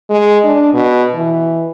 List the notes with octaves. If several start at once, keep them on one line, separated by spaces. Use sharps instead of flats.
G#3
D4
B2
E3